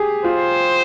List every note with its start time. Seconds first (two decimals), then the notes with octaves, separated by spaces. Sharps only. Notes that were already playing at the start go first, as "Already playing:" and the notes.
Already playing: G4 G#4
0.24 F4 C5